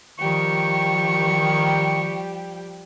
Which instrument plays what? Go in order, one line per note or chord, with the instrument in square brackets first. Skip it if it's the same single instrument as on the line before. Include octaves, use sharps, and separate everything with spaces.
[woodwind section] D#3 [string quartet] F3 G3 G4 [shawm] C#6